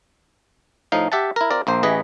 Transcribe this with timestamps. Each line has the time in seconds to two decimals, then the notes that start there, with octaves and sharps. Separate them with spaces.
0.92 A2 F3 D#4 F5
1.12 G4 E5 F#5 A5
1.36 E4 A#4
1.51 C4 F4 A#4 D5
1.67 A#1 A#3 C5
1.83 A1 E3 G#4 B4 D#5